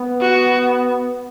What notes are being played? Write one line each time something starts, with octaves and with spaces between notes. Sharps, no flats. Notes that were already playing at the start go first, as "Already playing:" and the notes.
Already playing: B3
F#4